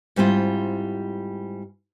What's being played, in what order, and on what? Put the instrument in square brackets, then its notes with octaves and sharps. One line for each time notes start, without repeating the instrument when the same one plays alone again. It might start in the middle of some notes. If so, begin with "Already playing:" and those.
[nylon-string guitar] G#2 G3 C4 E4 F4